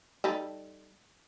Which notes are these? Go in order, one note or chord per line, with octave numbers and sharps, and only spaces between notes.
G3 D#4 A4